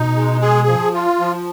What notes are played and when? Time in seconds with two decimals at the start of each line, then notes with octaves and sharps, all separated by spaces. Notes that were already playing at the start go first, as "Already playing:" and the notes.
Already playing: B2 D#4
0.16 G#3
0.41 G#4
0.67 F3
0.94 F4
1.20 F3